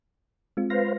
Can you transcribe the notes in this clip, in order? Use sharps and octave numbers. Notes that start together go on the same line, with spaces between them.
G#3 C4 F4
B4 C5 F5 A#6